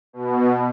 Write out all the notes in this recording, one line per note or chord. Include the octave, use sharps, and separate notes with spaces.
B2